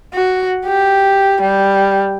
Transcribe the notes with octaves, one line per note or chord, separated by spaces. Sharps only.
F#4
G4
G3